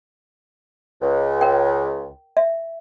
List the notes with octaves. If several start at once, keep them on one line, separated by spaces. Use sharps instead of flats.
C#2
A#4 G5
E5